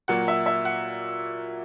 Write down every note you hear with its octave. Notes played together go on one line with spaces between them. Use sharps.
A#2 F#3 A#3 F#5
E5
E5
F#5